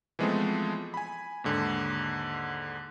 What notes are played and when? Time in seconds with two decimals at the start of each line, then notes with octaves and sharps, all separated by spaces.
0.19 E3 F3 G#3 A3 B3 C4
0.94 G#5 B5
1.44 D#2 G#2 D3